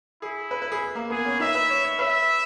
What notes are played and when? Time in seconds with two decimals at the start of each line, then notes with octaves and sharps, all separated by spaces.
0.22 E4 G#4
0.51 B4
0.62 B4
0.72 G#4
0.95 A#3
1.10 B3 G#4
1.25 C#4
1.40 D#4 E5
1.55 B4
1.70 C#5
1.84 C#5
1.99 B4 E5